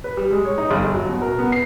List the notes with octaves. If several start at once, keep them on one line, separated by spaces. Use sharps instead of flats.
B4
G3
G#3
C#5
D#4
G1
F#3
B2
A#4
B3
C7